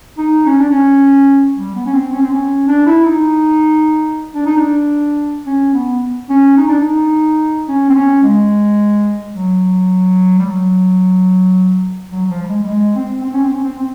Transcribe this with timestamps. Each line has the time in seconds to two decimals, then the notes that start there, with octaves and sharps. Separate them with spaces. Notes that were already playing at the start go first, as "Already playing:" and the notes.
0.18 D#4
0.46 C#4
0.59 D4
0.70 C#4
1.57 G3
1.75 B3
1.86 C#4
1.94 C4
2.12 C#4
2.22 C4
2.30 C#4
2.68 D4
2.87 E4
3.05 D#4
4.34 D4
4.46 D#4
4.57 D4
5.46 C#4
5.74 B3
6.29 C#4
6.57 D#4
6.69 D4
6.80 D#4
7.68 C#4
7.89 C4
7.95 C#4
8.23 G#3
9.35 F#3
10.39 G3
10.45 F#3
12.11 F#3
12.26 F#3
12.31 F3
12.42 G3
12.49 G#3
12.63 G3
12.68 G#3
12.96 C4
13.23 C4
13.33 C#4
13.43 C4
13.54 C#4
13.64 C4
13.79 C4